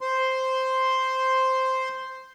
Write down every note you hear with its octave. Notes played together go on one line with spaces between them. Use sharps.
C5 C6